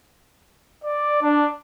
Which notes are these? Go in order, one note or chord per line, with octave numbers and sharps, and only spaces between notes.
D5
D4